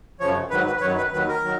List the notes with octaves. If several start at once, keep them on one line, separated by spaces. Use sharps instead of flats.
F#2 C#3 F3 C#5
G#2 D#3 F#3 B4
B4
B4
F#2 D#3 F#3 C#5
B4
D#2 D#3 F#3 B4
A#4
D#3 F#3